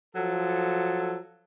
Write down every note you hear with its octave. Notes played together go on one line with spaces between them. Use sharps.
F3 F#3 A4